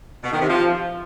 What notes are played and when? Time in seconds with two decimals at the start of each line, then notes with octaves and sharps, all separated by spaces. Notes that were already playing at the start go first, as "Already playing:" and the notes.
0.24 B2
0.32 D#3
0.40 C3
0.49 F3